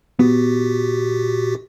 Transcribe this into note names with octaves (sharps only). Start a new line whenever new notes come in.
A#2 B3 F#4 G4